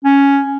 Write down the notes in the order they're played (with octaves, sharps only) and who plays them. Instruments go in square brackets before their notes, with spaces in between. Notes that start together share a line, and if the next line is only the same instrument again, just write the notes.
[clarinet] C#4